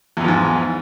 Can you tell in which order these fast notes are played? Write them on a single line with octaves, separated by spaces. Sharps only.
E2 E3 F3 G#2